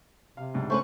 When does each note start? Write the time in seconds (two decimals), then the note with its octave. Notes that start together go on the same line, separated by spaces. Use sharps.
0.37 C3 F5
0.54 C#2 G#2 D4
0.70 A3 C#4 B4 C5 C#6